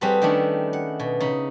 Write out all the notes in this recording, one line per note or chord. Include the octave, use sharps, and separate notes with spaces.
G3 C4 F#4 G#4 A4 B4
D#3 G3 A3 C#4 D4 E4
F#5
B2
C#3 D#4 B5